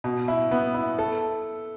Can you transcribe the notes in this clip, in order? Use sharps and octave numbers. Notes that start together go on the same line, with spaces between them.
B2
E4
B3
E4
A4